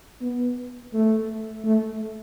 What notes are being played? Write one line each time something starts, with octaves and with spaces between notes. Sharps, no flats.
B3
A3
A3